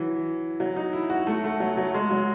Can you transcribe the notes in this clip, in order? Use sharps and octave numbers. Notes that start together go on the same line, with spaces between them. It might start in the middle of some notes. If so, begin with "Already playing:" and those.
Already playing: E3 F#3
F#3
D#4
E4
F#4
A3
A3
F#3
F#3
G#3
F#3